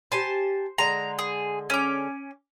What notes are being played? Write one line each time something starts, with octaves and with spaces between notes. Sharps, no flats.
G4 C5 G#5 A5
D3 G#3 A#5
G#4
C#4 D6